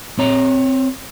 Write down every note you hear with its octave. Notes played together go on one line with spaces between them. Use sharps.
C4 C#5 A#5